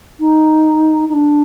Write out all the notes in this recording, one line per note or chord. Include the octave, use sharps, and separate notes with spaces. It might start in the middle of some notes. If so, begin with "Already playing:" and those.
D#4
D#4
D4